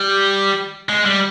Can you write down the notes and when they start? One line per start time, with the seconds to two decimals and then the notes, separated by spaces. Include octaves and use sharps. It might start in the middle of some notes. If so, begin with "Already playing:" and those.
Already playing: G3
0.89 G#3
1.05 G3